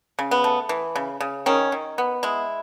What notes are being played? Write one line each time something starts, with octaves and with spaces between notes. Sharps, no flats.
C#3
B3
A3
E3
C#3
C#3
D#3 C#4
D#3
B3
G#3 E4